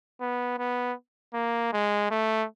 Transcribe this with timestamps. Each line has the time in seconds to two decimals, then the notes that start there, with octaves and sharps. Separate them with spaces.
0.21 B3
0.58 B3
1.34 A#3
1.73 G#3
2.11 A3